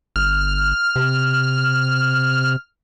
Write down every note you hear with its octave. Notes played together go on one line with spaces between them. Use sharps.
G1 F6
C3